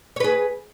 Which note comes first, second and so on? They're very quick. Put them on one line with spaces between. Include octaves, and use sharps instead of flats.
C#5 B4 G#4